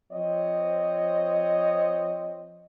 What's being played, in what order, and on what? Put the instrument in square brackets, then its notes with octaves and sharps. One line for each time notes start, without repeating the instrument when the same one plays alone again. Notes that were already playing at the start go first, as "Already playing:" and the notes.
[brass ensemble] F3 C4 C#5 D#5